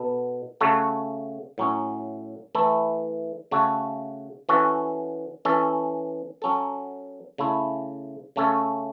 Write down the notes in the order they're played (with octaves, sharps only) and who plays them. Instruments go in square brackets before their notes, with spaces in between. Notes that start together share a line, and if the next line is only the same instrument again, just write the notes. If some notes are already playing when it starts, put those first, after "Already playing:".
Already playing: [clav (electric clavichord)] B2 B3 A4
C#3 A3 F#4 A4
A2 F#3 C#4
E3 A3 E4 A4
C#3 A3 F#4 A4
E3 C#4 F#4 A4
E3 C#4 A4
F#3 C#4 A4
C#3 A3 E4
C#3 A3 C#4 A4